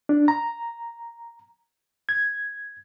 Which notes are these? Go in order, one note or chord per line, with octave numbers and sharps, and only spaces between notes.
D4
A#5
G#6